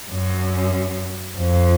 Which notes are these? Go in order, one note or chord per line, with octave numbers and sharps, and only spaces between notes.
F#2
F2